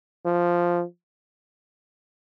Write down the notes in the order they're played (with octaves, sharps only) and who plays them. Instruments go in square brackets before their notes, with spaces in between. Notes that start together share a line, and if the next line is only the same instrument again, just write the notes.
[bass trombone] F3